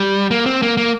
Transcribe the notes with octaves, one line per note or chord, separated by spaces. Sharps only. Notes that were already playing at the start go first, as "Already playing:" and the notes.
Already playing: G3
A#3
C4
A#3
A#3